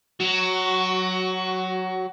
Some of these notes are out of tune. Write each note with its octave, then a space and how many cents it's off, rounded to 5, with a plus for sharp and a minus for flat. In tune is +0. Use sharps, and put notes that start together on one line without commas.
F#3 +0 F#4 +20